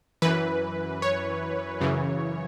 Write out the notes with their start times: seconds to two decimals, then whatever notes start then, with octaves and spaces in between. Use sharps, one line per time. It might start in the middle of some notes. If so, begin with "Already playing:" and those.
0.22 F#2 E3 B4
1.02 C#5
1.81 F#2 C#3 E3